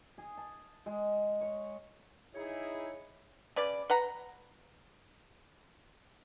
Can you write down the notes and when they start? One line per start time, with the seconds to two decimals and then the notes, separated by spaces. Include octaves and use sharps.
0.18 G#4
0.37 A5
0.86 G#3
1.41 C#5
2.34 D#4 E4 G#4 C#5
3.56 C#3 B4 D5
3.90 B4 F#5 A#5